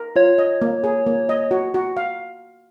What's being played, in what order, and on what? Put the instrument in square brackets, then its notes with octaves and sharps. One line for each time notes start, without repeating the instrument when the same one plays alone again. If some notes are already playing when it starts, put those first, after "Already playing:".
Already playing: [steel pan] A#4
[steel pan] F4 [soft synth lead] C#5
[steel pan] D#5
A#3
G#4
A#3
D#5
F#4
F#4
F5